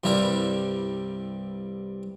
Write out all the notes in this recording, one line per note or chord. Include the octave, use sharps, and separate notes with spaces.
C2 G2 G3 E4 A#4